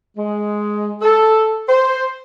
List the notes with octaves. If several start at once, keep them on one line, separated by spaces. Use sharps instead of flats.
G#3
A4
C5